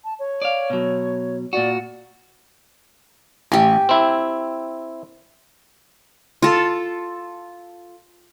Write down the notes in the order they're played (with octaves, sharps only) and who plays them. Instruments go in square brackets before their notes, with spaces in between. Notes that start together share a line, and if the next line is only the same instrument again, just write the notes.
[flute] A5
C#5
[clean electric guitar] D5 F5
B2 F#3
[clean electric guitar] A#2 F#4 [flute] D5
[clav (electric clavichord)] A1 [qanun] G4 G#5
[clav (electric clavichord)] C4 E4
[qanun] F4 A4